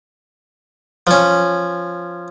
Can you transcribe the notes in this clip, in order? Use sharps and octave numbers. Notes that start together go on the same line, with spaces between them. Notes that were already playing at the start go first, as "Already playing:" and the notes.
F3 C#4